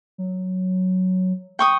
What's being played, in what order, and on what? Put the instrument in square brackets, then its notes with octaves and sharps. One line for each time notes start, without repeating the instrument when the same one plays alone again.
[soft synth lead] F#3
[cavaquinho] G5 C#6 D#6